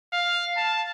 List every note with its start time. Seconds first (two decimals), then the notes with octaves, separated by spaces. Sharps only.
0.13 F5
0.57 A5